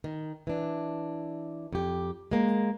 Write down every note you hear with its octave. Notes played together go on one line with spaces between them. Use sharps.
D#3
E3 D4
F2 G4
G#3 A#3